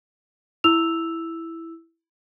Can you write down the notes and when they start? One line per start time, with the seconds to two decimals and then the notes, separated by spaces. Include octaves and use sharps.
0.64 E4 E6 F7